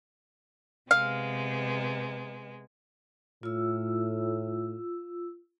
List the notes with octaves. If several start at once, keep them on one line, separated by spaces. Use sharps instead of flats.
C3 G#3 B3 F5
A2 F4 E6